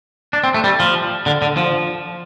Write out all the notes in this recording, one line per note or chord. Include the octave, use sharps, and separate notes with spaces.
D4
C4
A3
G3
F3
D3
D3
F3